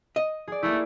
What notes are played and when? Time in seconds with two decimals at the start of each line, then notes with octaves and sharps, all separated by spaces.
0.16 D#5
0.48 G#4 D5
0.63 A3 A#3 E4